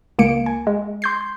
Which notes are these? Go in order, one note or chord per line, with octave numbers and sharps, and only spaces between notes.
C#2 A#3 C#7 D7
G#5
G#3
C6 G6 C7